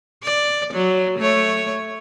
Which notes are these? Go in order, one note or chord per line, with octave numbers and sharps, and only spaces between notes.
D5
F#3
A3 C#5